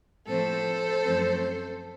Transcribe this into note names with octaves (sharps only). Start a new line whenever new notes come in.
A2 F3 A3 C4 A4 C5
F#2 F3 A3 C4